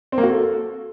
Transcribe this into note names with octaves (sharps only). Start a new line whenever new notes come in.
C4
A#3
F#4
A4